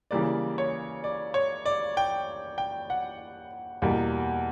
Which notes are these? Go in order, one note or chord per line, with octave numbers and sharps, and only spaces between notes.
C#3 E3 G3 A#3 D5
C#5
D5
C#5
D5
G5
G5
F#5
E2 B2 G3 A#3